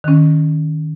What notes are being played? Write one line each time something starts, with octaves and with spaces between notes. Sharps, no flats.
D#3 C#4